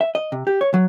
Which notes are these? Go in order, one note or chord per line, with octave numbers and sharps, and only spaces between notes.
E5
D#5
C3
G4
C#5
F#3